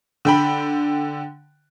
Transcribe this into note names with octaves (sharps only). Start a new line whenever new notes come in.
D3 G5 B5